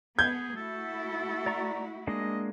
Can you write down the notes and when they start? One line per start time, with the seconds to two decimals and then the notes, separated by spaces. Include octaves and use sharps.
0.19 B3 G#4 G6 G#6
0.56 A3 E4 F#4 A4
1.46 D5 A#5 C#6
2.07 G#3 A#3 D4 D#5